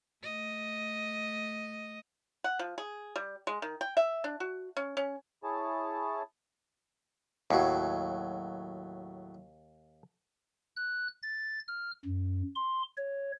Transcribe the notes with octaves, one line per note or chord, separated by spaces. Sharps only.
A3 D#5
F#5
F3
G#4
G3
G#3
D#3
G5
E5
D4
F#4
C#4
C#4
E4 G#4 C#5 A5
D#2 A2 F#3
F#6
A6
F6
F#2
C6
C#5